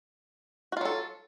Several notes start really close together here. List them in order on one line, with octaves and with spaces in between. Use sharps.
F#4 F4 F#3 A4